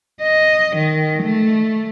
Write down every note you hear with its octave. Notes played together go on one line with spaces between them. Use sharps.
D#5
D#3
A3